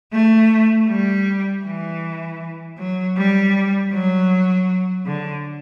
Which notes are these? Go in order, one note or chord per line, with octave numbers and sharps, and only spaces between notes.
A3
G3
E3
F#3
G3
F#3
D3